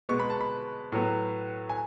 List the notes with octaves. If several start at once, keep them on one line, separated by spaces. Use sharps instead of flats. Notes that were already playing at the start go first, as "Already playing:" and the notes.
B2 G#3 B3 C#6
B5
A5
B5
A2 F#3 B3
G#5